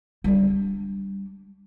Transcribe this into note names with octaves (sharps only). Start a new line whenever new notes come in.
G3 D4